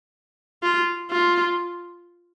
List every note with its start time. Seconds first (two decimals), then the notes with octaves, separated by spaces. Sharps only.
0.63 F4
1.11 F4